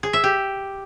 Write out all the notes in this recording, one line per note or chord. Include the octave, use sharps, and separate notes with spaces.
G#4
E5
G4